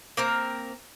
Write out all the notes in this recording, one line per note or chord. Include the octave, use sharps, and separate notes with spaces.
A#3 C4 A#4